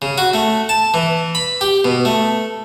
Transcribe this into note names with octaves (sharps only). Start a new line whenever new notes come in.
C#3
F#4
A3
A5
E3
B5
G4
B2
A3